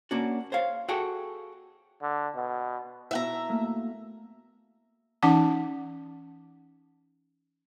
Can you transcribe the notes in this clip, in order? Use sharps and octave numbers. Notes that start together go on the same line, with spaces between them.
A#3 C#4 D4 F#4
C5 C#5 F5
F#4 G#4 A4 G5
D3
B2
B2 E4 E5 F#5 A#5
A3 A#3 E6
E3 C#4 D#4 F#5 A5 D6